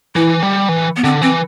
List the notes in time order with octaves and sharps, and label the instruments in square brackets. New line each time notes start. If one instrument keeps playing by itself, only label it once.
[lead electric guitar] E3 [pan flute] E4
[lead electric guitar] G3
E3
[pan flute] B3
[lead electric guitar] D3 [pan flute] C4
[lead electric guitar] E3 [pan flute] C4